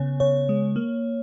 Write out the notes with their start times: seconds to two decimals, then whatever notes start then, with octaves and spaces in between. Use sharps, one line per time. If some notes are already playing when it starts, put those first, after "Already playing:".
Already playing: C#3 B3 C#5
0.20 C#3 C#5
0.49 G#3
0.76 A#3